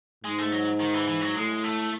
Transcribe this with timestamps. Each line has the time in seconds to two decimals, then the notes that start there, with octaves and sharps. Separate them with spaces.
0.24 G#2 G#3
0.38 A3
0.52 F#3
0.80 D#3
0.94 E3
1.07 E3
1.21 F#3
1.35 A2 G#3
1.64 A3